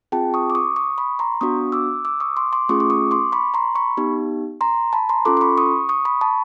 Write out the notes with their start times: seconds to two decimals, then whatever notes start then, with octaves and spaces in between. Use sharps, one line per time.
0.12 C4 F4 G#4 G5 A5
0.34 C#6 D#6
0.50 D6
0.55 C#6 D#6
0.76 C#6 D#6
0.98 B5 C#6
1.19 A#5 C6
1.41 B3 D4 F#4 C#6 D#6
1.72 D6 E6
2.05 D6 E6
2.20 C#6 D#6
2.37 C6 D6
2.53 C6 D6
2.69 A3 C#4 F4 G#4 C#6 D#6
2.80 D6
2.90 C#6 D#6
3.11 C6 D6
3.32 B5 C#6
3.54 A#5 C6
3.75 B5 C#6
3.97 B3 D#4 G4
4.61 A#5 C6
4.93 A5 B5
5.09 A#5 C6
5.25 C#4 F4 A4 C6 D6
5.37 C6
5.41 B5 C#6
5.57 C#6 D#6
5.89 C#6 D#6
6.05 B5 C#6
6.21 A5 B5